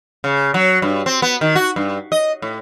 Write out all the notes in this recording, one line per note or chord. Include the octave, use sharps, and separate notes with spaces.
C#3
F#3
G2
C4
B3
D#3
F#4
G2
D#5
A2